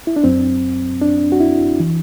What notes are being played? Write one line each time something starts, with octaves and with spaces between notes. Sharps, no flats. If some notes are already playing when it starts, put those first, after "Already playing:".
E4
D4
F#2 F#3 C4
D4
F#4
E4
E3